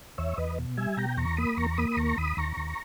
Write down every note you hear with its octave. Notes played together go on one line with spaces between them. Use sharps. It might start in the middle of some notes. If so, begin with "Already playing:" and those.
E2 C#5 E5
E2 B4 D#5
B2
G3 E5 G#5
B2 G5 A#5
E2 A#5 C#6
A#3 B5 D#6
E2 A#5 C#6
A#3 B5 D#6
B5
D#2 A#5 C#6
D#2 B5 D#6
D#2 A#5 C#6
D#2